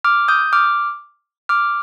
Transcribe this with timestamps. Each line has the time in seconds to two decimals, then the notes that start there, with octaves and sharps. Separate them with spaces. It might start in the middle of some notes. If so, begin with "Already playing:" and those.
0.04 D6 F6
0.28 D#6 G6
0.53 D6 F6
1.49 D6 F6